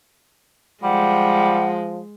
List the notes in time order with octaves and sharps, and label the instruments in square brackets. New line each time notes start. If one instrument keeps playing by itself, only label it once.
[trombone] F3 [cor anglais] G3 [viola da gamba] G#3 [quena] F#5